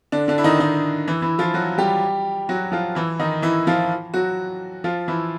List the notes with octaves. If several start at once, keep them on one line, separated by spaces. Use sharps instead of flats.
D3 D4
D3 D4
E4
D#3 D#4
D#3 D#4
E3 E4
E3 E4
F3 F4
F#3 F#4
G3 G4
F#3 F#4
F3 F4
E3 E4
D#3 D#4
E3 E4
F3 F4
F#3 F#4
F3 F4
E3 E4